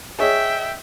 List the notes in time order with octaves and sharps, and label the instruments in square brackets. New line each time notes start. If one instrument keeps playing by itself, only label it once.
[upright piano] G#4 C#5 D#5 [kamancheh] E5 G5